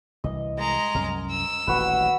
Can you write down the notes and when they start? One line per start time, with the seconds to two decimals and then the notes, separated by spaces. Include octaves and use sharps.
0.24 C2 E3 D#5
0.59 G#3 A#5
0.95 C2 F#2 C#4 A#4
1.31 E6
1.67 D#1 A1 F#4 B4